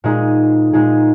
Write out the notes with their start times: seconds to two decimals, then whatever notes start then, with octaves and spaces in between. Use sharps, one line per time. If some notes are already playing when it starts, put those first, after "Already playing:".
0.04 A#2 G#3 D#4 G#4
0.73 A#2 G#3 D#4 G#4